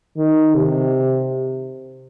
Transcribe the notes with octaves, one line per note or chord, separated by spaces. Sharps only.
D#3
C3